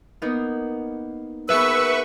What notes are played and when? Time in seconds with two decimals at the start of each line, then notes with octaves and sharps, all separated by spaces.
0.22 A#3 B3 D#4
1.49 A#3 B3 G#4 B4 E5 C#6 E6